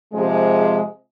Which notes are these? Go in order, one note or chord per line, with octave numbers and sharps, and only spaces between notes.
C3 F3 G#3